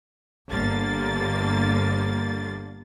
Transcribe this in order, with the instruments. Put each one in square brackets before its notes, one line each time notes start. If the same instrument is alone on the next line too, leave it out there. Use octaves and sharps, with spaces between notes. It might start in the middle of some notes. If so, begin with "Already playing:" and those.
[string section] G1 D3 A#3 A6